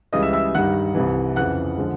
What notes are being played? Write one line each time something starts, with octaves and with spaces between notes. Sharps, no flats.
C#2 C#3 E3 G3 D#5 D#6
E5 E6
E5 E6
G2 D#3 G3 F#5 F#6
C2 C3 E3
F2 C#3 E3 F#5 F#6
D3 F3 G#3